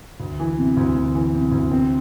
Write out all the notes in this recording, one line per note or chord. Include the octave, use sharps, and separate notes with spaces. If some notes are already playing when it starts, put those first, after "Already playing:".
D2
E3
C3
D2
D2
E3
C3
D2
C4